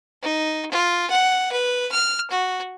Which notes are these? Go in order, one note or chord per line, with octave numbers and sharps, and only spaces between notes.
D#4
F4
F#5
B4
F6
F#4